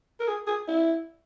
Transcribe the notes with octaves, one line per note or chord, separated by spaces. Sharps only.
A#4
G#4
G#4
E4